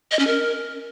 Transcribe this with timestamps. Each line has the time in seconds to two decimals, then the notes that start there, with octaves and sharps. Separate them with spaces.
0.11 D#5
0.19 C#4
0.27 A#4